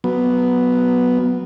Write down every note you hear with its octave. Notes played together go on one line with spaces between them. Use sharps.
F#3 B3